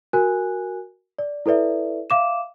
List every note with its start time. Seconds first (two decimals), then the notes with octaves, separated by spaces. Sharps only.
0.13 F#4 A#4 G#5 F#6
1.19 D5
1.46 E4 A4 B4 D5 E5
2.10 E5 F5 D6 E7